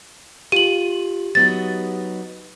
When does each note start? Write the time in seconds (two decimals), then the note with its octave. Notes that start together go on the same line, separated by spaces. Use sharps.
0.52 F4 G4 D#7 F#7
1.35 F#3 B3 D#4 A6